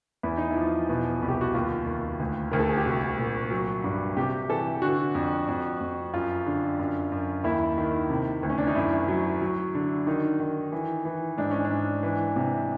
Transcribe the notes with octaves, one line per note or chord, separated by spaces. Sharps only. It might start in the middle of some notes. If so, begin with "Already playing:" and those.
E2 E4
D#4
E4
F3
B2
C2
G4
F#4
D#2 F4
D#2
D2
D2 A#4
A4
G#4
G4
C2 F#4
A#2
F#3
G2
C3 G4
E3 A4
D3 F#4
F2
F2
F2
F#2 F4
D3
F#2
F#2
D#2 E4
D#3
C3
D2
C#4
D4
D#4
F#2 E4
F#3
F#3
D3
D#3 D#4
D#3
E3
E3
G#2 D4
C#4
D4
G#2
E3
C3